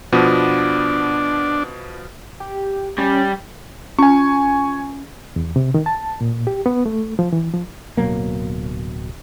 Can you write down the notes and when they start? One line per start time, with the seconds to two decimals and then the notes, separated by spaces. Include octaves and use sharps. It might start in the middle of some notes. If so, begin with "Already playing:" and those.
0.12 B2 F3 B3 D4
2.40 G4
2.98 G3 C#4
3.99 C#4 G#5 C#6
5.36 E2
5.56 C3
5.74 D#3
5.86 A5
6.21 A#2
6.47 G4
6.66 B3
6.86 A3
7.19 F3
7.33 E3
7.54 F3
7.97 D1 B2 F#3 A#3